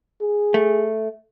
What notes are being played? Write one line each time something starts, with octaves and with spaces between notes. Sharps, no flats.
G#4
A3